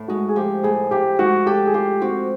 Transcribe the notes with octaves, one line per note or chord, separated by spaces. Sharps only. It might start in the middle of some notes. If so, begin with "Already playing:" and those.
Already playing: A2
G#3 F#4
G#4
F3 G4
A2 G#4
A2 G4
G#3 F#4
G4 A4
G#4
F4 G4
C4 F#4